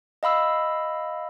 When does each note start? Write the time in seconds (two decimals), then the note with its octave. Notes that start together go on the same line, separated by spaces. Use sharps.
0.23 D#5 F5 B5 E6